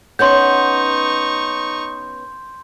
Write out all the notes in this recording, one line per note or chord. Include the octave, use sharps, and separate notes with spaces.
B3 C#4 D#4 C6 C#6 G6